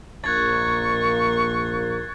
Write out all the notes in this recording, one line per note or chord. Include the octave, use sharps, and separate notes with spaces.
A#1 A#3 C#6 F#6 G#6 A6